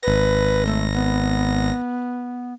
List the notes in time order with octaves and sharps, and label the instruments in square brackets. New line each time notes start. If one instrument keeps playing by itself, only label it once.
[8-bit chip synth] G#1 A#6 [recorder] B4
[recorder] A3
B3